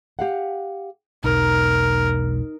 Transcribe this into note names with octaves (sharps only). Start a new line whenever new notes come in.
G4 F5 F#5
E1 B1 D#4 A#4